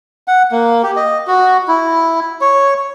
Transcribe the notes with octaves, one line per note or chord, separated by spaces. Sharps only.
F#5
A#3
G4
D#5
F#4
E4
C#5